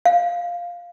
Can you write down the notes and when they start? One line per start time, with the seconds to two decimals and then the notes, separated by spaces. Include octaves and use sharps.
0.05 F5